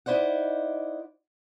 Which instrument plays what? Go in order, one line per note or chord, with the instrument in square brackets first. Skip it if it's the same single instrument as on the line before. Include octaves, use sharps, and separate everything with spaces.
[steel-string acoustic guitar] D#4 E4 C5 D5 F#5